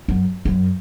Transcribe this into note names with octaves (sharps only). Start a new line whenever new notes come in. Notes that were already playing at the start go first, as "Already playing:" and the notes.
F#2
F#2